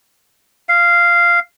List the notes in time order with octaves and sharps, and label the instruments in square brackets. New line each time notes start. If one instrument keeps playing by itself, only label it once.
[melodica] F5